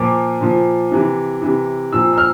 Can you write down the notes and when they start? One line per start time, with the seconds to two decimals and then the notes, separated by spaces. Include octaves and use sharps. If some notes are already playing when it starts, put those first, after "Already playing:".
Already playing: A#2 F3 D6
0.41 A#2 F3
0.91 C3 E3
1.42 C3 E3
1.93 A#2 F3 E6
2.13 E6
2.18 F6